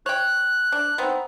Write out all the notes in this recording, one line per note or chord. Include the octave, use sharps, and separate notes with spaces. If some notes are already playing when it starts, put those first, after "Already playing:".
C#5 G5 F#6
D4
B3 C4 D#4